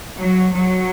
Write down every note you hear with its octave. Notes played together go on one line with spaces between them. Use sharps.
F#3
F#3